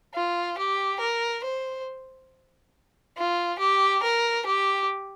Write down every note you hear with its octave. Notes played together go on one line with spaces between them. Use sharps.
F4
G4
A#4
C5
F4
G4
A#4
G4